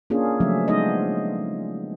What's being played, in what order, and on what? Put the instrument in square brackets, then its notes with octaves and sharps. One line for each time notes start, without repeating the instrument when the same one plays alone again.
[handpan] A#3 C#4 D4 F4 G#4
C#3 F3 F#3 A3 C#4 E5
G#3 B3 D4 D#4 C5 D#5